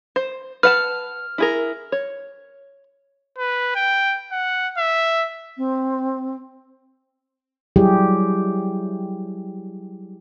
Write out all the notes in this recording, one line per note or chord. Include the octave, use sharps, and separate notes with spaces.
C5
B4 F#5 A5 F6
E4 G#4 A#4
C#5
B4
G5
F#5
E5
C4
F#3 G3 E4 G4 G#4